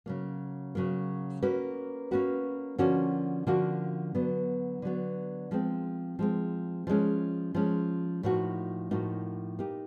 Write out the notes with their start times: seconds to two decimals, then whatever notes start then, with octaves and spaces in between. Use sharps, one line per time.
0.06 C#3 F#3 A#3
0.75 C#3 F#3 A#3
1.43 A#3 C#4 F#4 B4
2.11 A#3 C#4 F#4 B4
2.78 D3 F3 A#3 C#4 F#4
3.47 D3 F3 A#3 C#4 F#4
4.15 D3 F#3 B3
4.82 D3 F#3 B3
5.51 F3 G#3 C4
6.19 F3 G#3 C4
6.87 F3 G#3 C#4
7.55 F3 G#3 C#4
8.23 A2 F3 A#3 D#4 F#4
8.91 A2 F3 A#3 D#4 F#4
9.59 A#3 D#4 G4